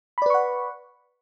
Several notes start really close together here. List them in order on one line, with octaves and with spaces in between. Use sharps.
B5 D5 B4 C#6 F#5